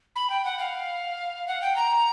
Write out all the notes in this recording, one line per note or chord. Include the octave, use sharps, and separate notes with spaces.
B5
G5
F#5
F5
F#5
G5
A#5